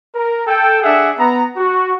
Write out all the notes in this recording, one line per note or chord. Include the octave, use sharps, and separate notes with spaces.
A#4
A4 G5
D4 G#4 E5 F#5
B3 A#5
F#4